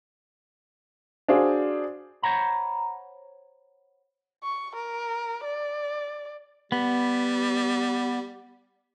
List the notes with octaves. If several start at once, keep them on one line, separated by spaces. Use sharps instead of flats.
D4 F#4 G#4 C5 D5 F5
C5 C#5 F#5 A#5 B5
C#6
A#4
D5
G3 B3